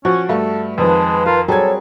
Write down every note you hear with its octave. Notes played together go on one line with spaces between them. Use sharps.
F3 C#4 F#4
G2 A3 A4
F2 D#3 F3 G#3 B4 A5
F4 A#4 F5
F#3 G3 C4 G#4 A4 C#5 G#6